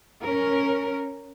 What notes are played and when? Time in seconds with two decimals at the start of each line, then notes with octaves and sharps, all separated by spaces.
0.22 C#4 A#4